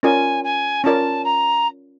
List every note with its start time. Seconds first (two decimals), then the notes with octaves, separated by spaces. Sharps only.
0.03 C#4 F4 A#4 D5 G#5
0.44 G#5
0.84 C#4 F4 A#4 D5 A5
1.24 A#5